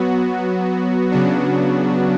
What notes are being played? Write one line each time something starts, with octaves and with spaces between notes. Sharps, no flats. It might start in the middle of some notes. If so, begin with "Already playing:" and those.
Already playing: F#3 B3 F#4
C#3 F#3 B3 D4 F#4